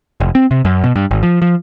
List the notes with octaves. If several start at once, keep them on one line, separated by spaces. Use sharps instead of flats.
F1
C4
C3
F#2
B2
G2
G#1
F3
F3